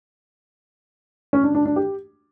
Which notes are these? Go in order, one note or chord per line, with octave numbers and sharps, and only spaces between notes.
C#4
D4
D4
D4
G4